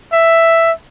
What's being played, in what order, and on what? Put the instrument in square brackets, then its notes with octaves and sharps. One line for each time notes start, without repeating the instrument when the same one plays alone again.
[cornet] E5